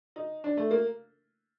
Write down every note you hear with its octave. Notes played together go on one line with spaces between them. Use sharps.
D#4
D4
A3
A#3